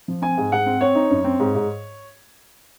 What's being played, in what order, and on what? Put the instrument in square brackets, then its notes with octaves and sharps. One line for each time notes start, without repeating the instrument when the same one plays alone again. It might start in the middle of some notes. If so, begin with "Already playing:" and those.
[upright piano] F3
C4 G#5
G#2
G#2 F#5
C4
C4 C#5
D#4
F#2
C4
G#2
G#2